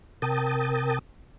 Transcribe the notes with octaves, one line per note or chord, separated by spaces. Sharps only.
C3 A#4 G5 A5 D#6